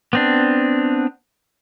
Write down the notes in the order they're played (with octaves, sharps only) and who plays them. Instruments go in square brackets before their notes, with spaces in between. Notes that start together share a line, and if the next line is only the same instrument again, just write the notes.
[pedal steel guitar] B3 C4 D4